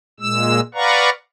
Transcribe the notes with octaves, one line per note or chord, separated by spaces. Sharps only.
A#2 G#3 E6
B4 D5 F5 F#5 A#5 C#6